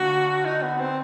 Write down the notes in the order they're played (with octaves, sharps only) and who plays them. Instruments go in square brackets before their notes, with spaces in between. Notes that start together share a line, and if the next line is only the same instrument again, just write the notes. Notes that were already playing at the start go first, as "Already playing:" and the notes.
Already playing: [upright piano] D3 A#3 [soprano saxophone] F#4
[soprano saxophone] D#4
B3
C4